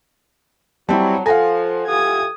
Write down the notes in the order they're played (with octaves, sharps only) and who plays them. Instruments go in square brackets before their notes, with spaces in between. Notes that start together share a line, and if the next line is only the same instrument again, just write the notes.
[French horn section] F#3 [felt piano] G3 C4 E4 [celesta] A5
[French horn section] F3 [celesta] A4 A#6 [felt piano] F5 F#5 G#5
[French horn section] E3 F4 G4 [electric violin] D#6 G#6